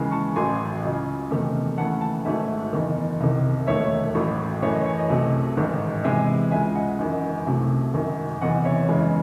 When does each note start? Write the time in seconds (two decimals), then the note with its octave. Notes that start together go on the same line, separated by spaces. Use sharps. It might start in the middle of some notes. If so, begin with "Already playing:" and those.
Already playing: D#2 C#3 E3 G#3
0.11 A5 C#6
0.36 A1 A2 F#3 G#5 C6
0.83 C#2 C#3 F#3
1.31 E2 C3 D#3 A3
1.78 D#2 C#3 E3 A3 F#5 A5
2.01 F#5 A5
2.25 G#1 G#2 F#3 A3 E5 G#5
2.73 F#1 E2 D#3
3.20 C2 C3 D#3
3.67 E1 D#2 D#3 A3 C#5 E5
4.15 A1 A2 F#3
4.62 F#2 E3 A3 C#5
4.74 D#5
4.86 C#5
4.98 D#5
5.10 C2 C3 F#3 A3
5.57 A1 G#2 D#3
6.04 E2 C3 E3 G#3 E5 G#5
6.51 C#2 C#3 G#3 E5 G#5
6.75 D#5 F#5
6.99 G#1 F#2 E3 D#5
7.46 C2 C3 F#3 A3
7.94 G#1 F#2 D#3
8.41 F#1 E2 C3 E3 D#5 F#5
8.65 C#5 E5
8.88 F#1 E2 C#3 E3 G#3